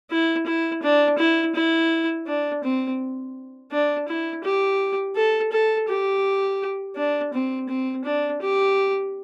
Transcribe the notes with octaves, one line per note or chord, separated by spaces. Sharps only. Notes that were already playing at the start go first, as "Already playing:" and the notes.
E4
E4
D4
E4
E4
D4
C4
D4
E4
G4
A4
A4
G4
D4
C4
C4
D4
G4